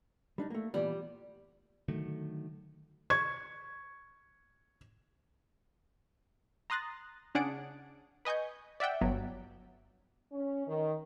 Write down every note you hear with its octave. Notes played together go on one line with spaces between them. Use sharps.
G3 D4 D#4
A3 A#3
A#2 E3 G3 B3
D3 D#3 F#3 A3
C#6 G#6
A#5 C6 D#6 F#6 A6 A#6
C#3 D4 G#4 F#5 D7
B4 D#5 G#5 C#6 G6
D5 E5 F#5 G5 E6
G1 F#3 B3
C#4
D#3